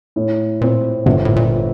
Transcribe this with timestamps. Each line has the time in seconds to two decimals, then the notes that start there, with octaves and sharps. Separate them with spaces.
0.16 A2
0.61 A#2 C4
1.06 G1 G2
1.25 A2
1.36 A#2